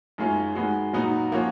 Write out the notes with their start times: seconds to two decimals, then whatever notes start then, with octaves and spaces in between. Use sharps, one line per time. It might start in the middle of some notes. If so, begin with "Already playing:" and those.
0.18 F#2 D#3 G#3 C#4 F4
0.55 D#3 G#3 B3 F#4
0.93 A#2 F#3 B3 D#4 F#4
1.32 F3 A#3 C#4 F#4 C#5